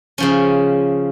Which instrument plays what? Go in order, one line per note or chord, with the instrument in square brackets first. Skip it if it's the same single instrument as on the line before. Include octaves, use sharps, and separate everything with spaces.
[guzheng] C#3 F3 C#4